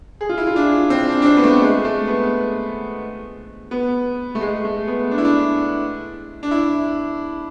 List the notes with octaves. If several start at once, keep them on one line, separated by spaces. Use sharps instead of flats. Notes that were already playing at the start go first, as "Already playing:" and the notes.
G#4
F4
E4
F4
D4
C4
D4
D4
C4
B3
A3
G#3
A3
B3
B3
A3
G#3
A3
B3
D4
E4
D4
D4
E4